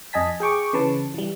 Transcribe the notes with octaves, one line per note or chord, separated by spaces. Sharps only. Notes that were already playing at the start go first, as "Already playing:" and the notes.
F2 D#5 G#5 A5 B6
G#4 G5 C#6 D6
C#3 E3 B4 A5
E3 G3